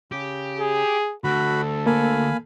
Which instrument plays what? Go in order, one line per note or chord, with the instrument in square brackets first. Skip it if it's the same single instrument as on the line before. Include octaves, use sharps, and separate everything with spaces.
[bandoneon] C#3 [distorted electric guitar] G4
[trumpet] G#4
[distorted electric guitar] D2 [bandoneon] F#4 B5 [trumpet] A4
[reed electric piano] A#3 [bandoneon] F5 G#5 B5